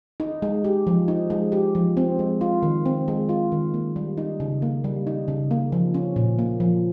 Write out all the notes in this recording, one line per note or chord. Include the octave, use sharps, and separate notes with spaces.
D#4
G#3
G4
F3
D#4
G#3
G4
F3
C4
G#3
F4
D#3
C4
G#3
F4
D#3
A#3
G3
D#4
C#3
A#3
G3
D#4
C#3
A#3
F3
C#4
A#2
A#3
F3